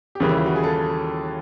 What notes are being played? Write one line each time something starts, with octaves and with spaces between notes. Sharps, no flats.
G4
D#2 C#3 E3 G3 G#4
E4
F4
F#4
G#4
A4